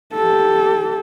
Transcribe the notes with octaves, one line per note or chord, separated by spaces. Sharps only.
G4 A4